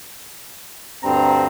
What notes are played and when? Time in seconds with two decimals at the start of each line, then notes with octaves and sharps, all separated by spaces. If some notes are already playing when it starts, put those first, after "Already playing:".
1.02 D2 G2 C4 A#5